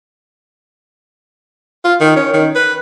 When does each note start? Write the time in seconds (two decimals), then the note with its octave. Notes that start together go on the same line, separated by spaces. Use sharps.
1.85 F4
2.00 D#3
2.16 C#4
2.34 D#3
2.55 B4